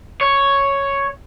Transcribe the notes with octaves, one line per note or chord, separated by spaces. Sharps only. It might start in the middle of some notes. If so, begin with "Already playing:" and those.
C#5